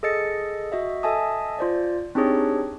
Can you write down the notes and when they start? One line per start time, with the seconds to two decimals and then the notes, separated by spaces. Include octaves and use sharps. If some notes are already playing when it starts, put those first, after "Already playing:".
0.03 G#4 A4 D#5 A6 C#7
0.72 F#4 D#5 E5
1.03 A4 D#5 E5 G#5 A5 D#6
1.59 F4 C5 D5
2.15 C4 D4 D#4 G4 G#4 C#5